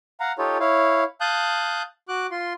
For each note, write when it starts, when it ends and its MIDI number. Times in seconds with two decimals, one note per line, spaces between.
0.20 0.32 77
0.20 0.32 78
0.20 0.32 82
0.38 0.58 63
0.38 0.58 65
0.38 0.58 67
0.38 0.58 69
0.38 0.58 73
0.60 1.04 64
0.60 1.04 73
0.60 1.04 77
1.21 1.82 77
1.21 1.82 81
1.21 1.82 87
1.21 1.82 90
1.21 1.82 91
2.08 2.27 66
2.08 2.27 86
2.08 2.27 90
2.31 2.53 65
2.31 2.53 84